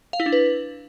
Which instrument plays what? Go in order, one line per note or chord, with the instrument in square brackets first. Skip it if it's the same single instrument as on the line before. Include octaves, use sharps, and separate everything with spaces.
[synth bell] F5
E4
D4
B4